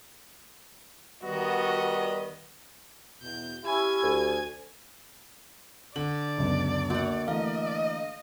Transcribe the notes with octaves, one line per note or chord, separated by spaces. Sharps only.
D#3 G3 B3 F#4 D#5
E2 B2 G6
C#4 E4 G4 G#5 G#6
D2
D3 D5 F#7
C#2 F#2 B3
A#3 F#4 F#5
E3 A3 A#3 D#5 F5